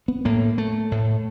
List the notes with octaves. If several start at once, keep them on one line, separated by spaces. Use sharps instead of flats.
B3
A2 A#3
A3
A2